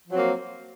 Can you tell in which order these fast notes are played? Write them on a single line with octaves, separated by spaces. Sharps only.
F3 F#3 C4 A#3